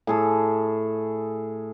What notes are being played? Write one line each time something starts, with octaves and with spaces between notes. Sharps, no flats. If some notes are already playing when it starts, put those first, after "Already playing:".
A2 G#4 A4